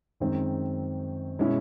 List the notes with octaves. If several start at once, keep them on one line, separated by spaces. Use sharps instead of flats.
F#2 D#3 G#3 C4
B2 G#3 C#4 E4